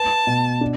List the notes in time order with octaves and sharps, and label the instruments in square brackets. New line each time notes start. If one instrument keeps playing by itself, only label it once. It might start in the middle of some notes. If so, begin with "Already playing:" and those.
Already playing: [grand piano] B4 [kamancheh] A5
[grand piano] B2
D4